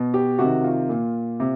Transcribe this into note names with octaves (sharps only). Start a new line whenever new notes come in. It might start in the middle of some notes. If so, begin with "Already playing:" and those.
Already playing: B2
G4
C3 D#3 F#4
F4
A#2
C3